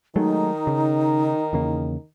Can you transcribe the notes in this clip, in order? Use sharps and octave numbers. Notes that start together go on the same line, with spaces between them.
D#3 F#3 G#3 A3 D#4
C#3
E2 C#3 A#3